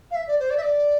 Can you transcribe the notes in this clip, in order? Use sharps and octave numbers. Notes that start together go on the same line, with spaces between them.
F5
E5
D5
C5
D5
E5
D5